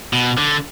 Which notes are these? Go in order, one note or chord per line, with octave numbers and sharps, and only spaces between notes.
B2
D3